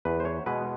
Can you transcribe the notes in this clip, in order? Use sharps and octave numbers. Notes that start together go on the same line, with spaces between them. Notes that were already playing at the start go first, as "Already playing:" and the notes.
E2 B4
C5
C#5
B2 G#3 B4